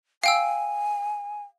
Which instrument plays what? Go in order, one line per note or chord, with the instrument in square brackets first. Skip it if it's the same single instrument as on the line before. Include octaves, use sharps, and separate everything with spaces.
[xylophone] F5 G5 E6 [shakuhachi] G#5